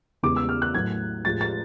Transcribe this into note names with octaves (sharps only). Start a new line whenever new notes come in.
E2 C#3 E3 G#3 D6
E6
F6
F#6
A2 F#3 A3 G#6
A2 F3 G#3 A6
A6